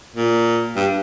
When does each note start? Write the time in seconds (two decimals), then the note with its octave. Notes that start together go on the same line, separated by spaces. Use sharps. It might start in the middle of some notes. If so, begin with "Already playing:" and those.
0.16 A#2
0.76 G2